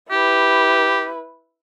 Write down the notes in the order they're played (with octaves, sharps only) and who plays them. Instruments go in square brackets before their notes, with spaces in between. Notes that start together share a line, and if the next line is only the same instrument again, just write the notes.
[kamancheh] E4 B4 [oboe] G4